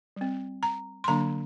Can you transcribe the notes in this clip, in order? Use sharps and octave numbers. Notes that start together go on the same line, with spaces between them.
G3 C4
A#5
C6
D3 F#3 A#3 D4 A#5